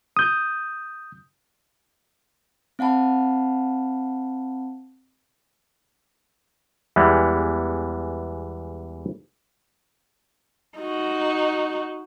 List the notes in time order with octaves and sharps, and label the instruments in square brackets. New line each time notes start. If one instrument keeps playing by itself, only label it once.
[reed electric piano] D#6 G6
[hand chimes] C4 F5 F#5 A5 B5
[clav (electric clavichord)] E2 E3 G3 G#3 B3
[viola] D#4 F#4